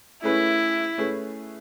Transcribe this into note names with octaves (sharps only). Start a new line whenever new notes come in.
A3 C#4 E4 G#4 B4
A3 C#4 G#4 B4